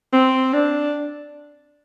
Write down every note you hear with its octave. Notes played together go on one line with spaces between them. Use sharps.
C4
D4